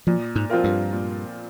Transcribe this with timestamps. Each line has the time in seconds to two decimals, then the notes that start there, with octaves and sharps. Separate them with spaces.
0.07 A#2 F3
0.36 G#2
0.50 F3 C4 F4 A#4
0.64 G2
0.93 A#2